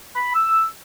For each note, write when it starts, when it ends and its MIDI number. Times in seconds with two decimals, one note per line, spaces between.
0.16 0.34 83
0.35 0.66 88